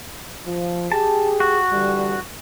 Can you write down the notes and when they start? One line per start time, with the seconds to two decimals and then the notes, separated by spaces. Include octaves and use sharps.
0.46 F3
0.92 G4 G#4 A5
1.40 F#4
1.72 D3 E3 G3